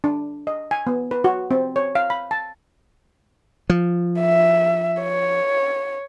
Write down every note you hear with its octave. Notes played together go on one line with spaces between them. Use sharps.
D4
D#5
G#5
B3
B4
F#4
C4
C#5
F5
B5
A5
F3
E5
C#5